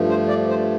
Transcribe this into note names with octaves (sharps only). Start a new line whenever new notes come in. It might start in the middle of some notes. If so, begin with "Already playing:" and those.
Already playing: G2 F3 A3
C5
D5
C5